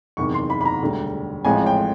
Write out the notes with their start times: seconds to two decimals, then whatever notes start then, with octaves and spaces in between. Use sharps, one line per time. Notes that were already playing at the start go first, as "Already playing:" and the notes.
0.17 F#1 E2 C3 D#3 C#6
0.34 C6
0.50 B5
0.61 B5
0.65 A#5
0.82 E1 D2 D3 G3
1.45 A1 A2 F3 G#3 C4 G#5
1.66 G5